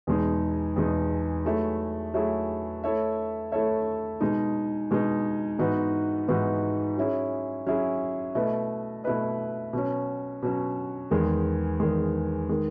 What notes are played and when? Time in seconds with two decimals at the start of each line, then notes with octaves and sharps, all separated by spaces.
0.07 E2 B2 G#3 D#4
0.76 E2 B2 G#3 D#4
1.46 F#3 A3 E4 G#4
2.14 F#3 A3 E4 G#4
2.84 A3 E4 A4 C#5 E5
3.52 A3 E4 A4 C#5 E5
4.21 B2 G#3 D#4
4.91 B2 G#3 D#4
5.59 G#2 E3 B3 D#4 F#4
6.28 G#2 E3 B3 D#4 F#4
6.97 F#3 C#4 E4 G#4
7.66 F#3 C#4 E4 G#4
8.35 B2 A3 E4 B4 D#5
9.04 B2 A3 E4 B4 D#5
9.73 B2 F#3 C#4
10.43 B2 F#3 C#4
11.11 E2 D#3 G#3
11.80 E2 D#3 G#3
12.49 D#3 G#3